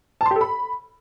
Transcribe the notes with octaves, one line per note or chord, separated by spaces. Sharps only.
A5
C6
G4
A4
B5